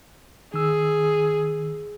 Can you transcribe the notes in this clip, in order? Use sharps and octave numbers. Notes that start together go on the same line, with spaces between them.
D#3 G#4 E6